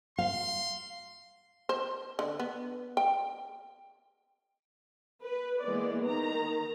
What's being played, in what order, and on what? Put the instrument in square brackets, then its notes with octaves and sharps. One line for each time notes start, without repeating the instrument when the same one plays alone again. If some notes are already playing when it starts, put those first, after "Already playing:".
[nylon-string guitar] F5 [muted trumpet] C6
[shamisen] C5
D3
B3
G5
[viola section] B4
E3 G#3 A#3 B3 D5
D#3 A#5